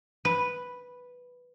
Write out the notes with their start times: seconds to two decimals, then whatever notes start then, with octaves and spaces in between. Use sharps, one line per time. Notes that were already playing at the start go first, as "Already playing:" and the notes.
0.25 B4